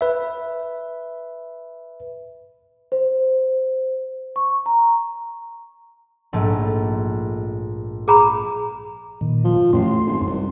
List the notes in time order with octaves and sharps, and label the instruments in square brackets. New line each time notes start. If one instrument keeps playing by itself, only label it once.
[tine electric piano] B4 E5
[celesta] C5
C#6
A#5
[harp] A#1 G#2 A3
[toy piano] G#4 A#5 B5
[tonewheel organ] A#2 D#3
[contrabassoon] F3
[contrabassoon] A1 [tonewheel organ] F#2 C6
[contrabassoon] G#1
C2